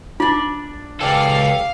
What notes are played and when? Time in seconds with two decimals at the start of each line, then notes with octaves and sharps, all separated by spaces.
0.20 D4 F4 D5
1.01 C#2 G4 A4 D5 F5